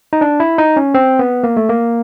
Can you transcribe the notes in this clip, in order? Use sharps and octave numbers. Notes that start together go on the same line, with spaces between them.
D#4
D4
E4
D#4
C#4
C4
B3
A#3
A3
A#3